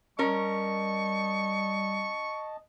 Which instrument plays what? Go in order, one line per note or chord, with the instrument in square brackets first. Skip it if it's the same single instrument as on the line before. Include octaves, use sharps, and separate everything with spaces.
[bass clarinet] G3 [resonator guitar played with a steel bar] C#4 A#4 [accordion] D#5 A5 [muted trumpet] C#6